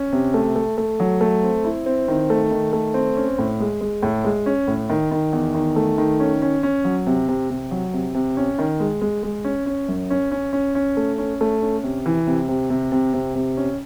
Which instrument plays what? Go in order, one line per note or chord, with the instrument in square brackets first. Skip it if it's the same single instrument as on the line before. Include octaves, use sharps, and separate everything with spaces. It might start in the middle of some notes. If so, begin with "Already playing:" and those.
Already playing: [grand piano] C#4
C3
A3
A3
A3
F#3
A3
C4
E4
C4
D#3
A3
D#3
A3
C4
C#4
A2
G#3
G#3
A2
G#3
C#4
A2
D#3
D#3
E2
D#3
A3
D#3
C#4
C#4
C#4
F#3
C3
C3
C3
F#3
C3
C3
C#4
D#3
G#3
G#3
G#3
C#4
C#4
F#2
C#4
C#4
C#4
C#4
A3
C#4
A3
C#4
C3
E3
C3
C3
C3
C3
C3
C3
C#4